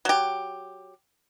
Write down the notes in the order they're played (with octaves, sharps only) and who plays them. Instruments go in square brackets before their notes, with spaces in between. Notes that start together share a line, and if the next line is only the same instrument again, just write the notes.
[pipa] F#3 G4